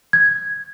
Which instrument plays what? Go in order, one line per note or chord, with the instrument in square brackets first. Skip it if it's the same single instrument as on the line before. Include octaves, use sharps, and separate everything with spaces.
[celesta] G#6